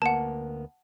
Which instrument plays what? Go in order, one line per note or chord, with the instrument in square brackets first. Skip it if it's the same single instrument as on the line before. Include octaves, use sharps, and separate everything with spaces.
[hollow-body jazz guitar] D2 A#3 B3 [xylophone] F#5 A5